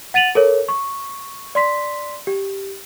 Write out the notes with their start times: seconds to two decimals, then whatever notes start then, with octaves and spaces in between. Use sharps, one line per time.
0.14 F#5 A6 D#7 F7 F#7
0.35 A4 A#4 C#5
0.69 C#6
1.55 D5 C6 B6
2.27 G4